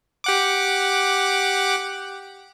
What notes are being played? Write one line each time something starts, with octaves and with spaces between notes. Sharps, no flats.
G4 F#5 D6